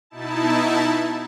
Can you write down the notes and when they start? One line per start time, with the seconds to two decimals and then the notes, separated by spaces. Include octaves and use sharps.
0.10 B2 D#4 E4 A5